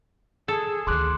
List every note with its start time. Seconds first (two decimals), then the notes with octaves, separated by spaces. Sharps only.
0.48 G#4 A4
0.87 D2 D#3 C6 D6 F#6